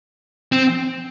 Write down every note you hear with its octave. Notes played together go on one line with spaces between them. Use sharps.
C4